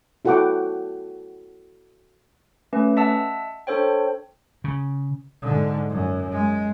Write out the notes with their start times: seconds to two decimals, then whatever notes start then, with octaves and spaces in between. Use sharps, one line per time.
0.25 E4 F#4 A4 F#5 G5 D6
2.73 A3 C#4 B4
2.97 D#5 E5 F#5 A5 E6
3.67 D4 A4 C5 C#5 G5
4.64 C#3
5.42 G#2 D3
5.89 F#2
6.32 G#3